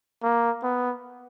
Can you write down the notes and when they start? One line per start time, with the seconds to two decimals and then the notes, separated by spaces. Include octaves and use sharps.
0.23 A#3
0.63 B3